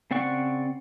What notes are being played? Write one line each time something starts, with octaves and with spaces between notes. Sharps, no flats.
C#3 C4 D5 F#5 C#6